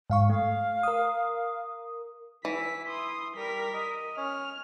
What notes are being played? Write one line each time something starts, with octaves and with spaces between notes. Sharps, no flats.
G#2 F5 C#6
A3 F5
A#4 D#6
E3 E4 B6
C6 D#6
G3 A#4 B6
D#5
C#4 F6